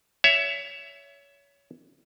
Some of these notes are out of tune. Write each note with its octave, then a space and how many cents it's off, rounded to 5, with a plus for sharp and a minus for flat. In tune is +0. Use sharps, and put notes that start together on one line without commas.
C#5 +25 E5 +10